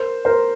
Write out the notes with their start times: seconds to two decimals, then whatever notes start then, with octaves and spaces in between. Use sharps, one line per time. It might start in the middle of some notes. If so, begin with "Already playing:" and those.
Already playing: A#4 C5
0.25 A#4 C5